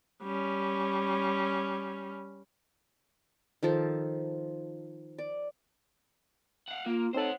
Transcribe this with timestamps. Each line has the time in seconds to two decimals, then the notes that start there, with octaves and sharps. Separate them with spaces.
0.23 G3 C#4
3.63 D#3 F3 A4
5.18 D5
6.68 F5 F#5
6.86 A#3 F4 A#4
7.14 C4 D#4 A4 C5 C#5 F#5